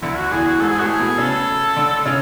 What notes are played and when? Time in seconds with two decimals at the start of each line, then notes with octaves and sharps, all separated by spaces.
0.02 D2 D3 E4
0.17 F#4
0.31 E2 E3 G#4
0.46 F#4
0.60 G#2 G#3 A4
0.69 G#4
0.79 A2 A3 F#4
0.87 G#4
0.99 B2 B3
1.18 C#3 C#4 A4
1.76 D3 D4
2.05 C#3 C#4